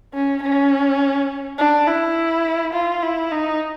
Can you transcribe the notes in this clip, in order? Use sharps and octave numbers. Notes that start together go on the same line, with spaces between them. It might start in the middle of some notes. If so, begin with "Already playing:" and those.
C#4
C#4
D4
E4
F4
E4
D#4